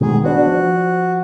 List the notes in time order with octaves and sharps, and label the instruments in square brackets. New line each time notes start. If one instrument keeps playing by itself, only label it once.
[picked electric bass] B2 D#3 G#3 [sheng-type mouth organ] G#4
[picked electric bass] B3 C#4 D4 [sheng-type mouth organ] F#4
[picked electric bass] F3